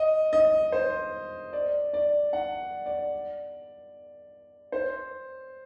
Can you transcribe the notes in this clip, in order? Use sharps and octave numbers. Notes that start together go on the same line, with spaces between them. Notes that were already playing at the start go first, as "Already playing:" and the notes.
Already playing: D#5
D#5
C5
D5
D5
F#5
D5
C5